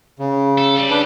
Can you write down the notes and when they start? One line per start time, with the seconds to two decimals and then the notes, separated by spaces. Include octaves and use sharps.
0.19 C#3
0.58 A4
0.76 G3
0.90 D4 G4 B4